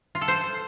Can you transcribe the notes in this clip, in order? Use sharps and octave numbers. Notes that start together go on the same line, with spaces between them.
F4
A4
C5